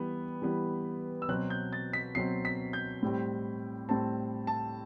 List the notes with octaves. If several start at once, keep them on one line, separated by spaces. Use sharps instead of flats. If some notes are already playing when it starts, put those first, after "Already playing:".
Already playing: E3 G3 B3
E3 G3 B3
E6
B2 F#3 C4 F#6
G6
A6
B6
B2 F#3 C4 C7
B6
G6
A2 G3 C4
A2 G3 C4 A5
A5